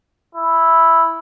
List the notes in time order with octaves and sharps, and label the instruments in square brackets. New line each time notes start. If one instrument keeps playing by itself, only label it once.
[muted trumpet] E4